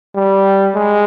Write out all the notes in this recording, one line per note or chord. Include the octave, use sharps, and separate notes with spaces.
G3
G#3